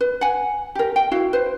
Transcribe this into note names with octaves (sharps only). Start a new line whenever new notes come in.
B4
F#5 G#5
G4 A#4
G5
E4 F#4 F5
B4 C5